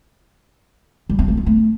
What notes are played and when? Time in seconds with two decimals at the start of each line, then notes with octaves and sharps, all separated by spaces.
1.09 G3
1.19 C4
1.28 A3
1.37 C4
1.46 A3